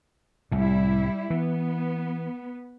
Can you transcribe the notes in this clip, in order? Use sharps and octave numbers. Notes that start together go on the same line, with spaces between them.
C2 A2 G3 E4
E3 B3